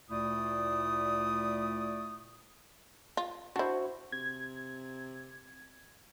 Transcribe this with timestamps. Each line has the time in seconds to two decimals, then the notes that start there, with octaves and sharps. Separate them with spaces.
0.08 D2 A#2 A3 E4 D5 D#6
3.17 F4
3.56 D4 E4 F#4 C5
4.12 C3 G#6